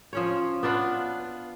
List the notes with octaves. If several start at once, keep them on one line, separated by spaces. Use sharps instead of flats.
F3 C#4 C#5
B3 D4 F4 B4